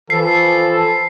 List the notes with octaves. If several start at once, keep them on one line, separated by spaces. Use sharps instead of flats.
E3 F3 A4 C7